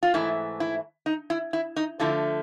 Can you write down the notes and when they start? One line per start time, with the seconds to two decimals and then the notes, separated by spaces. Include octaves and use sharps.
0.03 F4
0.14 G#2 E3 A3 E4
0.60 E4
1.06 D#4
1.30 E4
1.53 E4
1.76 D#4
2.00 D3 F3 A3 E4